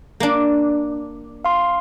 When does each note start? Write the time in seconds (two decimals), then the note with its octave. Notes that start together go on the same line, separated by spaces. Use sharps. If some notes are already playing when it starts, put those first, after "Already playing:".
0.20 A#3 D4
1.45 F5 C6